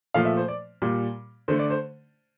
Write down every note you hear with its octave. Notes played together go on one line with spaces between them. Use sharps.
A#2 F3 A3 F5
E5
C5
D5
A#2 G3
D3 A3 C5
D5
C5